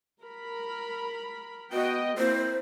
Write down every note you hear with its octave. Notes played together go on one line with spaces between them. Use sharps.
A#4 B5
B3 F#4 D#5 G5
A#3 C4 E4 C5